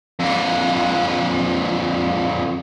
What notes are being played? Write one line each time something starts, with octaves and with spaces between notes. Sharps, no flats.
F2 D3